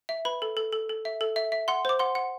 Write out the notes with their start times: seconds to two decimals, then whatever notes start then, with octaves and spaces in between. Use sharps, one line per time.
0.09 E5
0.25 B4 B5
0.42 A4
0.57 A4
0.72 A4
0.89 A4
1.05 E5
1.21 A4
1.36 E5
1.52 E5
1.68 F#5 C6
1.85 C5 D6
1.99 F#5 C6
2.15 F#5